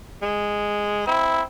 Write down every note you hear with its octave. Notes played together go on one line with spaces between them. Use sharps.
G#3
C4 E4